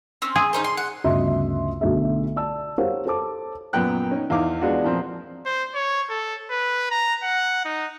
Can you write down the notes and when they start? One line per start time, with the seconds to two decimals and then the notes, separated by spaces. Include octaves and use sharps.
0.22 C4 C#4
0.36 G#4
0.53 C#4 D#4 C5
0.64 C6
0.77 F#5
1.04 G1 D2 C#3 D#5 E5 C6
1.81 B1 D3 A3 F#4 A4 E5
2.36 D5 A5 E6
2.78 G4 A#4 C5 C#5 F5 F#5
3.06 A4 C5 A5 D6
3.73 F#2 A#2 B3 G5 F#6
4.11 C#4 D#4
4.30 E2 E3 D#4 F5 D6
4.61 G#3 B3 D4 F4 F#4
4.84 A#2 F3 C4
5.45 C5
5.74 C#5
6.09 A4
6.51 B4
6.91 A#5
7.23 F#5
7.65 D#4